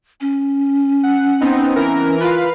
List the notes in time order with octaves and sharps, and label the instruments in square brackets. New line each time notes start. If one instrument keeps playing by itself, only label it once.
[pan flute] C#4
[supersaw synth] F#5
B3 C4 D#4
E3 A#4
[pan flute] F4 [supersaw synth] B4 F5